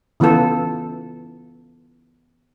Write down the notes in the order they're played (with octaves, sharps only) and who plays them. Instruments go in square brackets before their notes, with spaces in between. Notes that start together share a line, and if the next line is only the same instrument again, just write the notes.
[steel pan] C#3 E3 B3 F4 A4